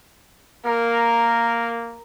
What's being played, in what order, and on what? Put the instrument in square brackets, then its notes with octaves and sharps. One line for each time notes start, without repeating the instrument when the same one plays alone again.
[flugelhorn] A#3 [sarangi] A#4